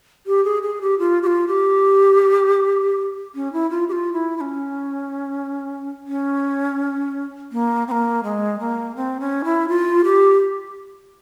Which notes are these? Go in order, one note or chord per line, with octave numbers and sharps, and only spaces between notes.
G4
G#4
G#4
G4
F4
G4
F4
G4
C#4
E4
F4
G4
F4
E4
E4
C#4
C#4
A#3
C4
A#3
G#3
A#3
C4
C#4
E4
F4
G4